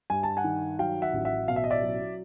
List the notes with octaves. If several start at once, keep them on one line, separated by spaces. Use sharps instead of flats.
G2 G#5
A5
F#5 G#5
D#3
F#3 F5 G5
E5 F#5
A1
E5 F#5
B2 F5
E5
D#5
D5 E5
F#3